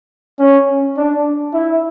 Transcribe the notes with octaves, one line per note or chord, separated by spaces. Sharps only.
C#4
D4
E4